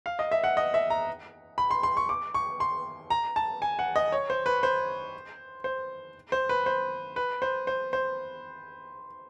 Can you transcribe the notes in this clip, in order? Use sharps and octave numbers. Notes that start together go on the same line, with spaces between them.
F5
D#5
E5
F#5
D#5
E5
A#5
B5
C6
C6
C#6
D6
C#6
C6
A#5
A5
G#5
F#5
D#5
C#5
C5
B4
C5
C5
C5
B4
C5
B4
C5
C5
C5